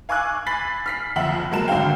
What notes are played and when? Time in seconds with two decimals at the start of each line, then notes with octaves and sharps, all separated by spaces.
0.09 F5 G#5 C#6 D6 E6 F#6
0.46 G#5 B5 A6 B6 C7 F#7
0.86 F6 B6 C7
1.16 F#1 F2 E5 F#5 F#7
1.51 F#3 G#3 A#3 A#4 A5 E7
1.68 G#1 D3 F#4 F5 G5